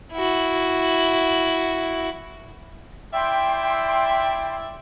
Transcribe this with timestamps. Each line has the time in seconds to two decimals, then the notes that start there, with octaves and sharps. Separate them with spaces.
0.13 E4 F#4
3.14 E4 D5 E5 G5 C6